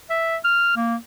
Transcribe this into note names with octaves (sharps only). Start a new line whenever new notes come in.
E5
F6
A#3